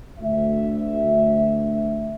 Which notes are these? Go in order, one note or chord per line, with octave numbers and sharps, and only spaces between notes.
D2 E5